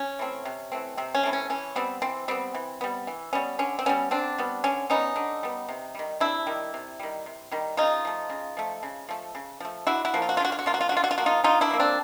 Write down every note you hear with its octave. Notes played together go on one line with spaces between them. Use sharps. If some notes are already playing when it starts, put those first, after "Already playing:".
Already playing: C#4
E3 A3 C4
C3
E3 A3 C4
C3 C4
C#4
E3 A3 C4
C#4
E3 C#4
G3 B3 C4
E3 C4
G3 B3 C4
E3
G3 B3
E3
G3 B3 C#4
D3 C#4
C4
G3 B3 C#4
D3 C4 D4
G3 B3
D3 C#4
G3 B3 C#4 D#4
D3
G3 B3
C3
D#3 G3
C3 D4 E4
D#3 G3
C3
D#3 G3
C3
D#3 G3
C#3 D#4 F4
F3 A3
C#3
F3 A3
C#3
F3 A3
C#3
F3 A3
D3 E4 F#4
E4 F#4
F3 A#3
F4
F#4
F4
D3 F#4
F4
F#4
F3 A#3 F4
F#4
F4
D3 F#4
F4
F#4
F4
F3 A#3 F#4
D#4 F4
D3 D#4 F4
D4 E4
F3 A#3
C4 D4